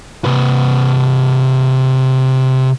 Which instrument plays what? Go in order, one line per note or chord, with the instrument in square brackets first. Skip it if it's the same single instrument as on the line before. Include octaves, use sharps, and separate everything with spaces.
[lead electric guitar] C3 B4